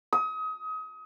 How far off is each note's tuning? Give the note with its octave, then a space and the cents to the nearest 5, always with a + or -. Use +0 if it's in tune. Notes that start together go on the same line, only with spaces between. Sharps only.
D#6 +30